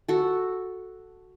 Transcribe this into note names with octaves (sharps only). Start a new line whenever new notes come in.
F#4 A4